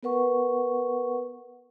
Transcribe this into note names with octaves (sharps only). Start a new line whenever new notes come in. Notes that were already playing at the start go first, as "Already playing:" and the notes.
B3 A#4 B4 F#5 C#6